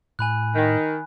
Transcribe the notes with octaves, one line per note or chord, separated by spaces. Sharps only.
A2 G#5 B5 F#6
D#3